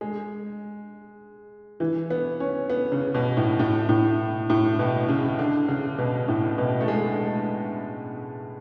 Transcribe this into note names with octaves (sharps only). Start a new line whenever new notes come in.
G#3
E3
B3
C#4
B3
C#3
B2
A2
A2
A2
A2
B2
C#3
D3
C#3
B2
A2
B2
A3
G#3